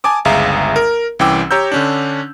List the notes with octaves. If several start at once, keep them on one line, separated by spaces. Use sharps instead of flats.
G#5 A5 D6 D#6
G1 C#2 G#4 E5 F5 A#5
A#4
C2 E3 C#4 G5 D6 E6
G4 C#5 A#5 E6 G6
D3 C#4 D4